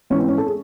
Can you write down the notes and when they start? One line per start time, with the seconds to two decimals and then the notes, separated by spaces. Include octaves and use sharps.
0.10 G#2 E3 C#4
0.20 C4
0.28 C#4
0.38 A4
0.46 G#4